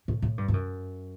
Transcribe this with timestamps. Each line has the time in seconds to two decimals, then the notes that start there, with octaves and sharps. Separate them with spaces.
0.08 A2
0.22 A2
0.38 G2
0.48 G2
0.54 F#2